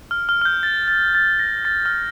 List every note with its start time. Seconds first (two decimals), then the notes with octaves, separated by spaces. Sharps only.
0.11 F6
0.29 F6
0.41 F6
0.45 G6
0.63 A6
0.88 A6
1.15 A6
1.39 A#6
1.65 A6
1.86 F6
1.91 G6